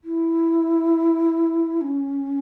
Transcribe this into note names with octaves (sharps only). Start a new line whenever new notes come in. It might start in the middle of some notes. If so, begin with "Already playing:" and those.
E4
C#4